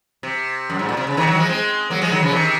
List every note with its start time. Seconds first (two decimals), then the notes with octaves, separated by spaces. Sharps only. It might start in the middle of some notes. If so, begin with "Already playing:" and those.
0.23 C3
0.70 F#2
0.79 G#2
0.89 A#2
0.97 C3
1.07 C#3
1.17 C3 D#3
1.27 D#3 F#3
1.38 F3 G#3
1.49 G#3 C4
1.90 F#3 A#3
2.01 F3 G#3
2.11 D#3 F#3
2.23 C#3 F3
2.32 C3 D#3